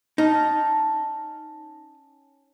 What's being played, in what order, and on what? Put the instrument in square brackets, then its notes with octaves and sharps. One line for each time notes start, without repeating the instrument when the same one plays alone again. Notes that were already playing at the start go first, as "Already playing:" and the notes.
[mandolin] C#4 A5 [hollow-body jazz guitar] D#4